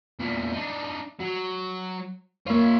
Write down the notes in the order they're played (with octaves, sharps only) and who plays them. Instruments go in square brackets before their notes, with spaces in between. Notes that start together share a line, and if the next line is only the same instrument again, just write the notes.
[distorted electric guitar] E2 A#2
D4 D#4
F#3
[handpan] A#3 C#5 [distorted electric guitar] F4 E5